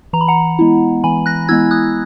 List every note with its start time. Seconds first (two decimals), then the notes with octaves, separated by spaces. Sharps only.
0.13 E3 A#5
0.21 B5
0.28 F#5 A#5
0.59 G#3 B3 E4
1.04 E3 G#5 B5
1.26 F#6 A#6
1.48 G#3 B3 E4 E6 G#6
1.71 D#6 F#6